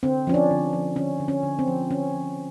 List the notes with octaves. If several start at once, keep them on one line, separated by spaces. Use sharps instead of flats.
D3 C4
F3 C#4
D4
D3
F3
D3 C#4
D3
C#4
D3
C4
F3
D3 C#4
F3